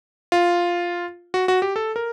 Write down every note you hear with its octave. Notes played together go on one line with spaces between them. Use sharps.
F4
F#4
F#4
G4
A4
A#4